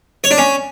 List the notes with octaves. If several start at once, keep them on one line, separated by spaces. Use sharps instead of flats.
C#5
D4
C#4